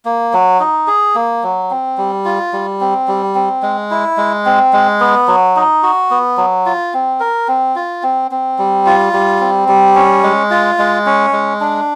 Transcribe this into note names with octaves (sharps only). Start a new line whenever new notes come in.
A#3
F#3
D#4
G#4
A#3
F#3
C4
G3
F4
G3
C4
G3
C4
G#3
E4
G#3
C4
G#3
B3
F#3
D#4
F#4
B3
F#3
F4
C4
A#4
C4
F4
C4
C4
G3
F4
G3
C4
G3
C#4
G#3
F4
G#3
C#4
G#3
D4